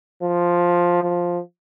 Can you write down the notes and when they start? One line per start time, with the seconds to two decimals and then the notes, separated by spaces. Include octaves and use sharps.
0.22 F3
1.03 F3